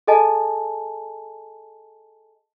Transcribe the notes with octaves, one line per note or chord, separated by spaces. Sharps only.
G#4 A4 D#5 G#5 A5